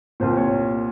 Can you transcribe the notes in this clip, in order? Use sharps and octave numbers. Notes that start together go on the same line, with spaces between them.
C2 A#2 C5
C#5